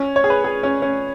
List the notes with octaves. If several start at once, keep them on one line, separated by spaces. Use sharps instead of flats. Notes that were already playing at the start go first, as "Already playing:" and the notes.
Already playing: C#4
C#5
G#4
B4
G#4
C#4
C#4